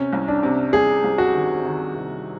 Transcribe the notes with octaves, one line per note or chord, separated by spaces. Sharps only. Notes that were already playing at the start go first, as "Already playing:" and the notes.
Already playing: C3 C#4
C2
D4
C3
C2 G#4
C2
F#4
D#3
D#3
C3